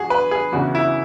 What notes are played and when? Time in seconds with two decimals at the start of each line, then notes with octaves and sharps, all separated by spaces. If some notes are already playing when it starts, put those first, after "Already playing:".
Already playing: E2 F#4 G#4
0.10 B4
0.31 G#4
0.52 E2 C#3 E3 F#4
0.75 E4